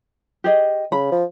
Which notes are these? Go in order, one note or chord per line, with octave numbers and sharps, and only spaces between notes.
G4 G#4 D#5
C#3 B5
F3